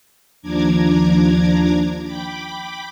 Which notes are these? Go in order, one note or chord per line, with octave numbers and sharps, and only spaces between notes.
D#2 F3 D4 A#5 D6 G#6
G5 B5 D6